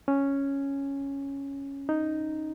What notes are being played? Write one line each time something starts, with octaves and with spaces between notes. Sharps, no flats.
C#4
D#4